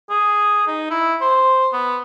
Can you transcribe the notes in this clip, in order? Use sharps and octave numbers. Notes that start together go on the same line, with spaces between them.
G#4
D#4
E4
C5
B3